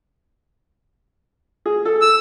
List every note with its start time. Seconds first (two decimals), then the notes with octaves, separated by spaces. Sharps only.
1.66 G#4
1.85 A4
2.02 E6